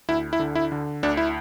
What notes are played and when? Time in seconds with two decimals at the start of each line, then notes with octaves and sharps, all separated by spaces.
0.09 D2 E4
0.33 E4
0.40 D3
0.55 E4
0.72 D3
1.03 D2 D4
1.17 E4